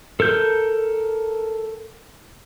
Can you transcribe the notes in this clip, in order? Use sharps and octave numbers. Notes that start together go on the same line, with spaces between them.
A4 A#4 G6